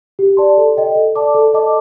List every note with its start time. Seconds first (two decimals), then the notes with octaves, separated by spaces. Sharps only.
0.19 G4
0.37 D5 A5 C6
0.58 A4
0.77 D#5 G5
0.95 A4
1.16 D5 A5 D6
1.34 A4
1.54 D#5 A5 D6